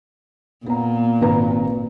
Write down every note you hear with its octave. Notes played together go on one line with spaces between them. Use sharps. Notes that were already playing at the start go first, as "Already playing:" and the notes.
A#2 B3 A#5
G#1 B4 A#5